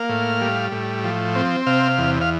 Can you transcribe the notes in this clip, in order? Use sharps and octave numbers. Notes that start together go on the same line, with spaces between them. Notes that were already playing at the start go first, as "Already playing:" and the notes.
Already playing: A#3 F5
A2
G3
A2
F3
C4
C3 F5
E2
F5